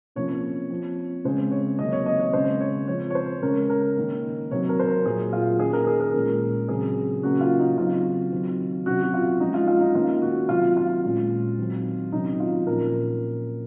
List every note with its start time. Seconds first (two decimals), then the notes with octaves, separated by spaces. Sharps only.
0.16 C3 F3 A#3 C#4 C#5
0.70 F3 C4
1.24 C#3 G#3 C4 C5
1.51 C#5
1.79 C3 D#3 F#3 A#3 D#5
1.92 C#5
2.06 D#5
2.19 C#5
2.33 C#3 G#3 C4 C5
2.60 C#5
2.88 F3 C4 C#5
3.10 C#5
3.15 C5
3.42 C#3 G#3 C#4 A#4
3.70 A#4
3.96 D#3 A#3 C#4
4.51 C3 F#3 C4 C#5
4.69 A#4
4.79 C5
4.87 A#4
5.05 A#2 F#3 A#3 G#4
5.33 F4
5.59 D#3 A#3 C#4 G#4
5.73 A#4
5.87 G#4
6.00 A#4
6.14 A#2 G#3 C#4
6.68 C#3 F#3 C4 G#4
7.23 C#3 F#3 A#3 C#4 F#4
7.41 F4
7.59 D#4
7.77 C#3 F#3 C4 F4
8.32 D#3 F#3 C4
8.86 C3 F#3 C#4 F#4
9.03 F#4
9.14 F4
9.40 F3 G#3 C#4 D#4
9.54 F4
9.67 F4
9.81 D#4
9.95 D#3 A#3 C#4 F4
10.22 F#4
10.49 C3 D#3 F#3 F4
10.77 F4
11.03 A#2 G#3 C#4
11.58 D#3 F#3 C4
12.12 C3 D#3 F#3 C#4 D#4
12.40 F4
12.67 A#2 F3 A#3 C#4 A#4